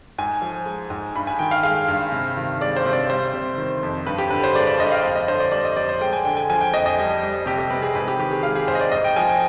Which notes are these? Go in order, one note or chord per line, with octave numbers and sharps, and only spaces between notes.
G#2 G#5
F3
G#3
G#2
G2 B5
G#5
D#3 G5
F5
G#3 F5
G2
C3
D#3
G#3 D5
C5
C3
D5
G3 C5
C3
D#3
F2
G2 B4
G4
D3 B4
C5
G#3 D5
D5
G2 D#5
F5
F2
D#5
D3 C5
D5
G3 D5
D#5
F2 D5
C5
G#3 G5
G#5
D3 G5
G#5
F3 G#5
G5
F2 D#5
D#5
G3
G3
C3 G4
G4
C3 B4
G#4
G#2 B4
G4
D#3 G4
G#4
G#3 F5
G#4
G#2 C5
D#5
D5
G#2 D#5
G5
F3 G#5
G5